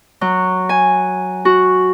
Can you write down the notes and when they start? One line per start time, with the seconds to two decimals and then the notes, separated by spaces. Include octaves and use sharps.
0.21 F#3
0.69 G#5
1.45 F#4